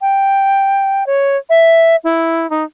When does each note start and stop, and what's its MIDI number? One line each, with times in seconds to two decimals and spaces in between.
0.01 1.06 79
1.06 1.37 73
1.50 1.96 76
2.04 2.49 64
2.50 2.63 63